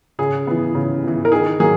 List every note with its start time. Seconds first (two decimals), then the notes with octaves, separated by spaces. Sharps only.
0.19 C#3 G#4
0.47 E3 B3
0.75 C#3
1.03 E3 B3
1.25 A#4
1.32 D#3 G#4
1.60 F#3 A#3 G#4